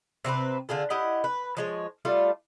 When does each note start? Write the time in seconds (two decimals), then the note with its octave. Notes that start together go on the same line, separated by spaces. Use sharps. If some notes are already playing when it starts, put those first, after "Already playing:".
0.25 C3 C4 F#4 B4
0.69 D3 F4 G#4 A4
0.90 E4 G4 D#5 F#5
1.24 B4
1.57 F3 G#3 C#5
2.05 G3 A3 F4